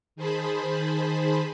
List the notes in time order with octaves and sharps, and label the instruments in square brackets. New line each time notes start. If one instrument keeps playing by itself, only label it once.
[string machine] D#3 G#4 C5 A5 B5